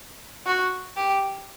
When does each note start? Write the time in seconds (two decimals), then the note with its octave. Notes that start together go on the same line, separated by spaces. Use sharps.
0.46 F#4
0.97 G4